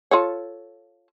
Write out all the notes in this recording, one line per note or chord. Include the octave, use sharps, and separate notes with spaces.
F4 A4 C#5